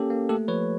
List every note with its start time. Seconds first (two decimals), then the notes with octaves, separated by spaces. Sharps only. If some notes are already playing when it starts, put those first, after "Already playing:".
Already playing: A#3 C#4 G4 A4
0.10 A#3
0.29 A3 G4 A4
0.48 F3 B4 C#5